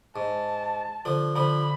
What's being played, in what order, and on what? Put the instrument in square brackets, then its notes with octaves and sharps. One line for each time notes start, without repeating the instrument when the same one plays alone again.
[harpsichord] G#2 [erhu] A5
[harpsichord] D3 F3
[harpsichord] D3 F3 [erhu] B5